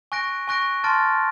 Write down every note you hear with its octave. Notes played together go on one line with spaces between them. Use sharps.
G#5 C#6 F#6 A#6 D7
G#5 C#6 F#6 A#6 D7
A5 C6 F6 A6 D7